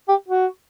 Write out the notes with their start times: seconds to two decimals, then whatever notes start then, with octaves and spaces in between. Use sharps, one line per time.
0.08 G4
0.28 F#4